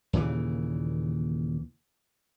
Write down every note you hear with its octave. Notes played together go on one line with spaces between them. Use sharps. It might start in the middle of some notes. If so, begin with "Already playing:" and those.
D#2 A#2 C#3 E3